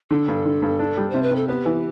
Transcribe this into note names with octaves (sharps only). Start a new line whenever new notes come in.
D3 A4
G2
D3
G2
D4
G3
C3 C5
B4
C3 A4
B3 G4
E3